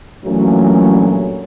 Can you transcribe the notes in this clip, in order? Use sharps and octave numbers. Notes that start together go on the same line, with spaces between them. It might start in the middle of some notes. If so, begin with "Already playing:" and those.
G2 A#2 E3 F#3 A3 C#4